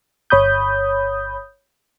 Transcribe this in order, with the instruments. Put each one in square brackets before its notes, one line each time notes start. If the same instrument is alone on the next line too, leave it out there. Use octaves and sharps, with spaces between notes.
[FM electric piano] G1 C#5 B5 D#6 G6